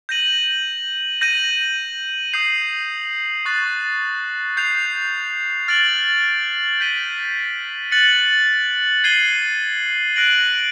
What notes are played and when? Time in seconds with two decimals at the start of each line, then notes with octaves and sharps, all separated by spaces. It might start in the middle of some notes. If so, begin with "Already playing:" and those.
0.09 G6 A#6 D#7 F#7
1.21 G6 A#6 D#7 F#7
2.33 D#6 G6 C7 F7
3.45 C#6 F#6 A6 C7
4.57 G6 C7 F7
5.68 F6 A6 D7 F#7
6.80 G6 B6 D#7 G7
7.92 F#6 A6 C#7 F#7
9.04 G#6 C7 D#7 G7
10.16 F#6 A#6 D7 F#7